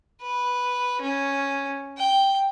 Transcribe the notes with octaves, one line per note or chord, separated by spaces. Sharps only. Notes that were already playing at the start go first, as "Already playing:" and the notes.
B4
C#4
G5